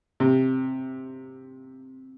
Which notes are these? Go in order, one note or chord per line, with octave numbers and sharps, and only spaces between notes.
C3